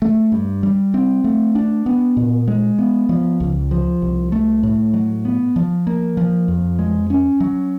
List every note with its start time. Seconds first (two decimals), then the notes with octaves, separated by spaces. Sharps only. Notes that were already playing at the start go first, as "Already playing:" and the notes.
0.02 A3
0.32 G2
0.63 G3
0.94 C4
1.24 A3
1.55 D4
1.86 B3
2.17 A#2
2.48 G#3
2.79 B3
3.09 F3
3.40 C#2
3.71 F3
4.02 C2
4.32 A3
4.63 A2
4.94 F#3
5.25 B3
5.56 F3
5.87 A#3
6.17 F3
6.48 F2
6.79 G#3
7.10 C#4
7.40 F#3